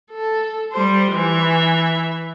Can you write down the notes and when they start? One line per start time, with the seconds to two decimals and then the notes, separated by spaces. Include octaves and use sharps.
0.12 A4
0.72 G3 C5
1.12 E3 E5